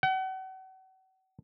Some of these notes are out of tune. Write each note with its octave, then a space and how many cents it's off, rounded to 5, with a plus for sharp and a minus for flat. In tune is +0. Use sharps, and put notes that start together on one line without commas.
F#5 +40